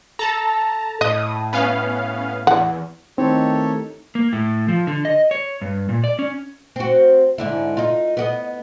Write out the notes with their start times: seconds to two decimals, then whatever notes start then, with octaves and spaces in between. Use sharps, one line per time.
0.19 A4 A5 A#5
1.01 A2 D#5 D#6
1.53 B3 C#4 F5
2.47 E2 F#5
3.18 D#3 A3 C4 D#4 E4 G4 A4 C#5
4.15 A#3
4.33 A2
4.68 F3
4.87 D3
5.05 D#5
5.31 C#5
5.62 G2
5.89 A#2
6.04 D5
6.19 C#4
6.76 C4 F#4
7.38 G#2 D3 E4
7.77 D#4 F4
8.17 B3 G4 D#5